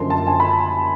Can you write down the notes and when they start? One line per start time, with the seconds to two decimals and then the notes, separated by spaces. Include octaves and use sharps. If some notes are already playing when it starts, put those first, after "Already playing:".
Already playing: F#1 F#2 D3 F3 C6
0.10 A5
0.27 G#5
0.40 B5